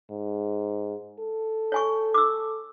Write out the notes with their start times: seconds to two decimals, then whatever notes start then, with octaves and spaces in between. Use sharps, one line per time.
0.10 G#2
1.20 A4
1.72 C#5 G#5 C#6
2.14 D6 E6